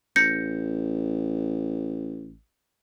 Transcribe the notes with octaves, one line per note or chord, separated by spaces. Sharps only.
A1 G6 A#6 C#7